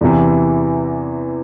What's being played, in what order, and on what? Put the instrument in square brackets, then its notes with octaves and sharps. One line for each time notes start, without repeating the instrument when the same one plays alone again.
[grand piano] E2 C3 E3